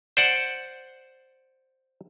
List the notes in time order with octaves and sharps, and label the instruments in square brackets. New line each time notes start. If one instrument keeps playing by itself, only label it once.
[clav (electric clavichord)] C5 D5 F#5